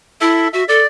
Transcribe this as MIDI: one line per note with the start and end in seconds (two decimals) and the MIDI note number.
0.21 0.47 64
0.21 0.48 69
0.21 0.48 76
0.53 0.63 66
0.53 0.65 76
0.68 0.82 69
0.68 0.87 74